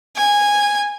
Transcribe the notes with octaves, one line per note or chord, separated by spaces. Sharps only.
G#5